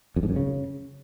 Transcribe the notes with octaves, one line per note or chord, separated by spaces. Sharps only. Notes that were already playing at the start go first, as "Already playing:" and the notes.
F2
G#2
F#2
C#3